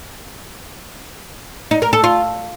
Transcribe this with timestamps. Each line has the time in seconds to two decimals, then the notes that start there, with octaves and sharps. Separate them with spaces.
1.71 D#4
1.82 A#4
1.93 A4
2.04 F4